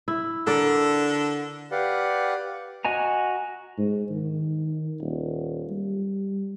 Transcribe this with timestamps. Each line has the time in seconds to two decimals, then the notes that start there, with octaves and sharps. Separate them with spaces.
0.08 E4
0.47 D3 A4 A#4 D5
1.71 G4 B4 D5 F5 F#5
2.85 F#4 D#5 G#5 A#5
3.78 G#2
4.10 D#3
5.01 D#1
5.71 G3